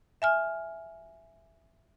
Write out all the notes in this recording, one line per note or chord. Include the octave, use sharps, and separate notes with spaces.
E5 G#5 F6